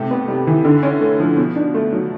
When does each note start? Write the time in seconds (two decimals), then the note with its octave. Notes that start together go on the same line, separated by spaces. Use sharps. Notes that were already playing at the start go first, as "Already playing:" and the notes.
Already playing: C3 A3
0.11 B3
0.28 G3
0.47 E3
0.65 D3
0.83 C#4
1.01 A3
1.20 F3
1.37 B2
1.56 D4
1.74 A3
1.93 F#3